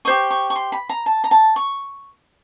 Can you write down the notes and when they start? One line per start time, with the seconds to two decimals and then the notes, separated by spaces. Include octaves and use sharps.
0.05 G4 C5 D#5 C#6
0.30 C#6
0.50 C#6
0.56 C6
0.72 B5
0.89 A#5
1.06 A5
1.24 A#5
1.31 A5
1.56 C#6